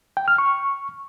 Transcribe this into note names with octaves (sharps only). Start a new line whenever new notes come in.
G5
F6
C#6